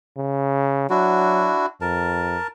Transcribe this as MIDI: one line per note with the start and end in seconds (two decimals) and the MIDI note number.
0.17 0.86 49
0.90 1.51 54
0.90 1.66 62
0.90 1.66 64
0.90 1.66 66
1.81 2.38 41
1.81 2.47 70
1.81 2.47 81